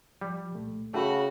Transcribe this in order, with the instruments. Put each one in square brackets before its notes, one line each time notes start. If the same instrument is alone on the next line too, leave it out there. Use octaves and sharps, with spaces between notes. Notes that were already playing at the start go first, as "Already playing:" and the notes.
[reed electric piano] F3 [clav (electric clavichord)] G3
[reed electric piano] C2 A#2 A3
[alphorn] C#3 [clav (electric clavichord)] A3 [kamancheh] F#4 [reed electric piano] G5 B5 C#6